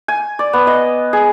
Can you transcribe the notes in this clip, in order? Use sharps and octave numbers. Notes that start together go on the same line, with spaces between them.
G#5
D5
B3
D#5
G#4